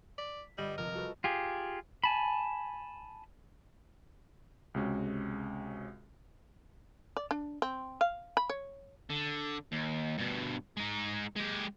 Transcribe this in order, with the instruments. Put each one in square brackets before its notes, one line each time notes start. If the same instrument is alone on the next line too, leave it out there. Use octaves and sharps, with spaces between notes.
[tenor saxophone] D5 [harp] B6
[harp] G1 D#5 [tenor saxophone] G3
[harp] F1 [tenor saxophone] A#4
[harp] F#4 A4 B4
[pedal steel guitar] F4 G4 G#4
G#5 A5 B5
[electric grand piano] C#2 C3 G#3 C#4 F#4
[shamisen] D5
D4
C4
F5
B5
C#5
[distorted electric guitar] D3
D#2
G2 B2
G#3 D#4
G#3 G4